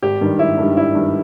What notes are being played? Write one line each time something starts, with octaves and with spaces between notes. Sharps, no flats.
G#1 G4
G2 D#3 G3
G#1 E4
G2 D#3 G3
G#1 E4
G2 D#3 G3